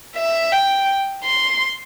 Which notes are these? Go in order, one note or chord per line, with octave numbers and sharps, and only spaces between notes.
E5
G5
C6